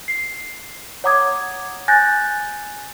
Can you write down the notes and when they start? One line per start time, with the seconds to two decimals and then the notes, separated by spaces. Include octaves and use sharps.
0.08 C7
1.04 C#5 F#5 A#5 D6 D#6 G#6
1.88 G#5 F#6 G6 A6 A#6